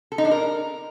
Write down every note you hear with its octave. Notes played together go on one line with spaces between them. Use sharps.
A4
D#4
D4
A#4